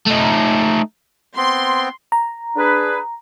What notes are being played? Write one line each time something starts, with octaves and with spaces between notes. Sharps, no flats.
A3 D#4
B3 C4 C6
A#5
D4 G#4 B4